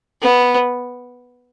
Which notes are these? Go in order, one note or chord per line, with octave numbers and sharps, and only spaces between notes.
B3